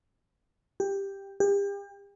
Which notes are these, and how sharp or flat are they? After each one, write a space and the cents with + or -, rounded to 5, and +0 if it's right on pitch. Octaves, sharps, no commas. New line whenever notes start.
G4 +10
G4 +35